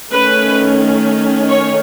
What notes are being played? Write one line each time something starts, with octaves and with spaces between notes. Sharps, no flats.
D#3 A3 C#4 B4
C#5